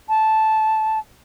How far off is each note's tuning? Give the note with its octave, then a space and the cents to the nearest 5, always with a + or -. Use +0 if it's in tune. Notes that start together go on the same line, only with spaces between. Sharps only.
A5 -10